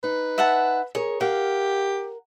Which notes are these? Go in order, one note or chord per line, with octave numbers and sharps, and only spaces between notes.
D#4 B4
E5 F#5 A5
G#4 A#4 C#5
G4 A#4 F5 F#5